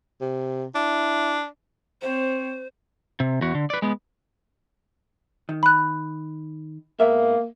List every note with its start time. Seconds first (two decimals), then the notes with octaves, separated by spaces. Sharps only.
0.21 C3
0.75 D4 E4
2.02 C4 C5 C#5
3.20 C3
3.41 E2 F#4
3.55 D3
3.70 B4 D5
3.82 G#3 B3
5.49 D#3
5.63 B5 F#6
7.00 G#2 A#3 B3 E5